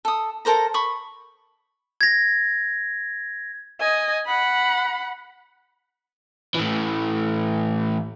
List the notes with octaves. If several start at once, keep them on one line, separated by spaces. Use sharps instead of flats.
A4 D#6
A4 A#4 C5 A#5
B5 C#6 D#6
G#6 A#6
D#5 G#5
F#5 B5
A2 E3